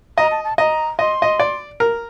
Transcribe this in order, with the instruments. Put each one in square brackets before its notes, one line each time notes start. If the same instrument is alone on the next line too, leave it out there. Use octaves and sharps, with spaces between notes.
[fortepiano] D#5 [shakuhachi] A#5
[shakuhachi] A5
A5
[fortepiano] D#5 [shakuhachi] A#5
[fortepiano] D#5 [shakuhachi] C6
[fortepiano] D#5
D5
A#4